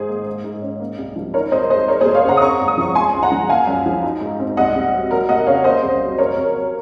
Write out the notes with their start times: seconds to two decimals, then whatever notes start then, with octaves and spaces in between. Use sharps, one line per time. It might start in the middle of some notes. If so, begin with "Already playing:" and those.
Already playing: G#2 D#3 D#4 G#4 C5
0.09 A#3
0.26 G#2
0.44 G#2
0.62 C#4
0.80 A#3
0.98 C2
1.16 F3
1.34 D#4 A#4 C#5
1.52 C2 C5 D#5
1.69 G#3 C5 D#5
1.88 G#3 A#4 C#5
2.01 G#4 C5
2.06 F1
2.15 C#5 F5
2.24 C#3 F#5 A#5
2.37 D#6
2.41 C4 A#5 C#6
2.60 G#1
2.68 D#6
2.78 F3 C#6
2.95 G#3 G#5 C6
3.14 C#2
3.23 F#5 A#5
3.32 F3
3.49 A#3 F5 G#5
3.67 F#2
3.86 F3
4.03 D#4
4.21 G#2
4.40 C4
4.57 C2 D#5 F#5
4.75 C2
4.93 F#3
5.11 F#3 A#4
5.29 F1 D#5 F#5
5.46 C#3 C#5 F5
5.64 A#3 C5 D#5
5.82 C2
6.01 F#3
6.18 F2 A#4 C#5
6.37 F2
6.55 F#3